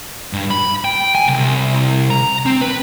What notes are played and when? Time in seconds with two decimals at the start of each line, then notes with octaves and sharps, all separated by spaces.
0.33 G2
0.51 B5
0.84 G5
1.15 G#5
1.28 C2
2.11 A#5
2.46 C4
2.61 B4